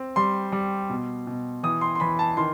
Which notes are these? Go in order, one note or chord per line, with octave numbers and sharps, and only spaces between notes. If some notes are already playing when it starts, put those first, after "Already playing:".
Already playing: C4
G3 C6
G3
B2
B2
E3 D#6
C6
C6
E3 B5
A5
D#3 C6